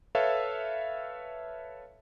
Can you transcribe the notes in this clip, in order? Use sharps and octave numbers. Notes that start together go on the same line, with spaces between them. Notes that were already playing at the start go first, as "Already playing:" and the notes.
A4 B4 C#5 E5 F5